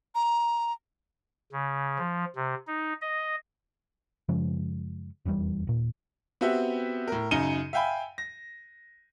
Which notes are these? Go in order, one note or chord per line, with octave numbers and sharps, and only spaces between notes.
A#5
C#3
F3
C3
D#4
D#5
F#2 C#3 F3 G#3
F1 E2 C#3 G3
D#1 A#2
B3 C4 F#4 G4 E5
A2 A#4
F#2 C#3 D#4 C#7 D#7 G7
E5 F5 G5 G#5 B5
A#6